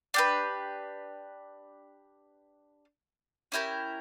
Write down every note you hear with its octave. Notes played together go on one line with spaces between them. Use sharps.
D4 G4 B4
C#4 E4 G4 A#4